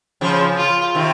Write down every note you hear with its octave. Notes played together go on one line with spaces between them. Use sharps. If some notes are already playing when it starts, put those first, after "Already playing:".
C#3 F3
F4
C3 D#3